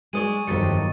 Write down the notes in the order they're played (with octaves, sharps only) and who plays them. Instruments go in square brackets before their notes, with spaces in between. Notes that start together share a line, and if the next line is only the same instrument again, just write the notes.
[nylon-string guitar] G#3 C#5 D5 [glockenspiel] C#6 D#6 D#7
[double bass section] G1 D#3 F#3 [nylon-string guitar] F2 C3 G3 [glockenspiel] A6 C#7